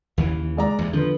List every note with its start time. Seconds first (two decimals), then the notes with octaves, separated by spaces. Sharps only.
0.18 D#2 C#3 E3
0.57 G#3 D5 A#5
0.79 E2 G2
0.93 D3 F3 B3